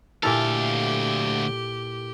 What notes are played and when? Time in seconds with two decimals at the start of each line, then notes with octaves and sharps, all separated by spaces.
0.23 D2 A#2 E4 G4 A4 F5